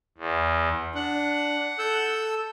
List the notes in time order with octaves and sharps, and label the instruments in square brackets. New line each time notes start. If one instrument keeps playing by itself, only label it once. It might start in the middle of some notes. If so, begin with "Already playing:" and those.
[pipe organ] E2
[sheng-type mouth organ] D4 [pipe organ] F#5
[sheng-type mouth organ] A4 E6 G6